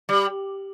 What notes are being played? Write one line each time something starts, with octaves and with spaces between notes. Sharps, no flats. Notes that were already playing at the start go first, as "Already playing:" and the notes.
G3